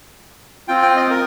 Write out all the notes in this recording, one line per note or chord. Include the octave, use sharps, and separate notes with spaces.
C4 F4 G5
G5
D#5
A#4